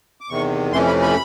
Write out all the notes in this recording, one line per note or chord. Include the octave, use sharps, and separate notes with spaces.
D6
E2 C3 D#3 C#6
F2 C3 E3 A3 C#4 C6
B5
B5